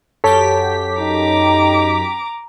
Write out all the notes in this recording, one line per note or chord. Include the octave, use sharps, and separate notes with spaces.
F#2 G4 A4 C#5 A5 B6
D#4 A#5 D6